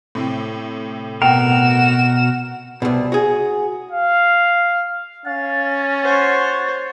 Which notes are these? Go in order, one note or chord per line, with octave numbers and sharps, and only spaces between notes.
A2 C3 C4
B2 F#4 A#4 G5 E7
C2 B2
F#4 G#4
F5
C#4 F5 A6
F#4 C5 C#5